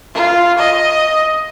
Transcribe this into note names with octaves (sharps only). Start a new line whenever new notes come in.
F4
D#5